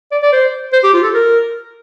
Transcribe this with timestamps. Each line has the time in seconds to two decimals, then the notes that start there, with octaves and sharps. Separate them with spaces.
0.12 D5
0.22 D5
0.32 C5
0.73 C5
0.83 G4
0.93 F4
1.03 A4
1.14 A#4